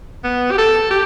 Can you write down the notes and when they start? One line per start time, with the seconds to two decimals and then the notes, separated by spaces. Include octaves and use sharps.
0.24 B3
0.51 G4
0.58 A4
0.90 G4